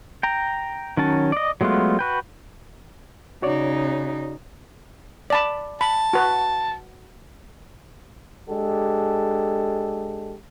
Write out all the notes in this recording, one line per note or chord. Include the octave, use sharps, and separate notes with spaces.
G5 A#5
D#3 F#3 C#4 A5
D5 D#5
F#3 G#3 A3 B3 F4
F#4 B4 G5
C#3 D#4 F#4 C#5 D5
D5 A5 B5
A5 B5
F#4 B4
G#3 D4 G4 A4